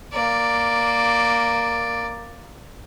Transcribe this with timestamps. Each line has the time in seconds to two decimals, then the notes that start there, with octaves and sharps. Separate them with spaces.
0.13 A#3 D5